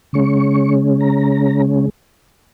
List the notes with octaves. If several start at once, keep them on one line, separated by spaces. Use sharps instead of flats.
C#3 G#3 C#4 C#6
A#5